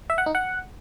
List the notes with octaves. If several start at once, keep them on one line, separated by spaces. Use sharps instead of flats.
E5
F#5
D#4
F#5